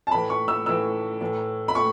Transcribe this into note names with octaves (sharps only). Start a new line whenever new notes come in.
A5
A2 E3 B5
C#6
E6
A2 E3 E6
A2 E3
B5
A2 C#6